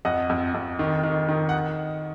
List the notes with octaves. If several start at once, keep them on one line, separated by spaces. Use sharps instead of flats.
F2 D#5 F#5
F2
F2
D#3
D#3
D#3
F#5